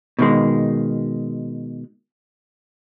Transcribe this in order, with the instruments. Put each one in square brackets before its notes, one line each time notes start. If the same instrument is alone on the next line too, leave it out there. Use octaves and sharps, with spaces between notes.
[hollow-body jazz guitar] B2 D#3 G#3